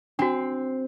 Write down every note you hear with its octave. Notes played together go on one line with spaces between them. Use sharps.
C4 D4 F#4